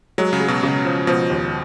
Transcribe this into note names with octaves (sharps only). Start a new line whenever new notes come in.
F#3 G#3
C#3
G#3
B2
C#3
F3
B2 F3
D#2